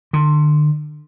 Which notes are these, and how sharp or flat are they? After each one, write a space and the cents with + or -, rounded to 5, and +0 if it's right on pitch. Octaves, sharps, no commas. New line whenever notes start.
D3 +35